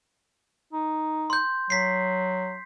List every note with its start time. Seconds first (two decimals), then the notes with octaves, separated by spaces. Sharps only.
0.73 D#4
1.30 C6 G6
1.70 F#3 B6 C7